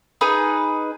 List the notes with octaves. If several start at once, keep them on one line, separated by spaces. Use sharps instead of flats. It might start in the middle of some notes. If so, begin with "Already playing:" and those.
D#4 G#4 B4